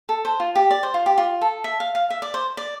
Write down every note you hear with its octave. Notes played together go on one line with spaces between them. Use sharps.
A4
C5
F4
G4
D5
C5
F4
G4
F4
A4
E5
F5
F5
E5
D5
C5
D5